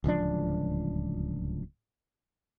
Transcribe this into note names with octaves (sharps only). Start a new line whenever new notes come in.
D1 C#2 F3 D4